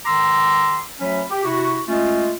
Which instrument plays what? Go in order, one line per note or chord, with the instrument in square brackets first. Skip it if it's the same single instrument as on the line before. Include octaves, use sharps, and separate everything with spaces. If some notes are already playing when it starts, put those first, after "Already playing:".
[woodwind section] D#3 A#5 C6 D6 E6
D2 F#3 C#4 B5
G4
C3 E4 F#4
G#3 A3 C#4 F4